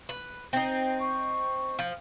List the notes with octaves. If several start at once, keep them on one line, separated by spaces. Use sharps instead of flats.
B4
C4 D#4
C#6
F3